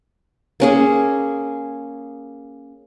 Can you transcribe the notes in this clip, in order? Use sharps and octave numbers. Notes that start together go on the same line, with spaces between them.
A#3 C#4 G#4